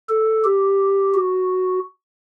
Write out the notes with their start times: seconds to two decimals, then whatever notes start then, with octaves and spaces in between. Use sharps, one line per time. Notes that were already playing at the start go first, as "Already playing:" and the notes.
0.09 A4
0.44 G4
1.14 F#4